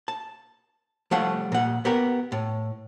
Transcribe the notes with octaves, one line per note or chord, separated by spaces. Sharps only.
A5
F3 G3 A3 F5 F#5
A#2 F#5
B3 G4 A#4
A2